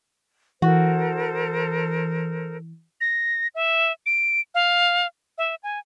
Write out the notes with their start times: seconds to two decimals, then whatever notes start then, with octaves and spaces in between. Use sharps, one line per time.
0.62 E3 F#4 A4 A#4 C5
3.01 A#6
3.55 E5
4.06 D7
4.55 F5
5.38 E5
5.63 G#5